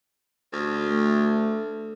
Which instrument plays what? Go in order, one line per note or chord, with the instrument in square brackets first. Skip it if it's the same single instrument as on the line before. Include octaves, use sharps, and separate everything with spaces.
[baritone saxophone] D2
[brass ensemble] A3